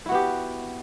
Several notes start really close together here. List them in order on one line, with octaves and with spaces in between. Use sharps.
E4 F#4 B3 G4